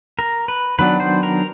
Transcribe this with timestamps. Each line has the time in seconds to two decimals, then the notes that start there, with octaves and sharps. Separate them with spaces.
0.19 A#4
0.48 B4
0.79 D#3 F#3 B3 D4 B4
1.00 C5
1.23 A#4